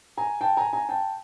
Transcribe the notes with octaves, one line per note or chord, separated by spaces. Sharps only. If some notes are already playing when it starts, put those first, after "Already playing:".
G#5 A#5
G5 A5
G#5 A#5
G#5 A#5
G5 A5